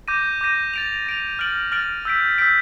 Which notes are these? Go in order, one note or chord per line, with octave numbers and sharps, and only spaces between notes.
D6 G6 A#6 D#7
D6 G6 A#6 D#7
A6 D7 F7
A6 D7 F7
F6 A6 D7 F#7
F6 A6 D7 F#7
E6 G6 B6 D7
E6 G6 B6 D7